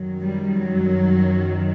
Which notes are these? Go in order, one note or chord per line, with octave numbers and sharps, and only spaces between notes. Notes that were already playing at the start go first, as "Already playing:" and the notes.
Already playing: F#2 D#3 F#3
G3
F#3